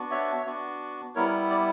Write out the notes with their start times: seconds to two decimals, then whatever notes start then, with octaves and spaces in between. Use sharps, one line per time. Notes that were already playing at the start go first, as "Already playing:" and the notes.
Already playing: B3 D4 F#4
0.11 C#5 E5
0.46 B3 D4 F#4
1.15 G3 B3 E4 A#4 C#5
1.50 D5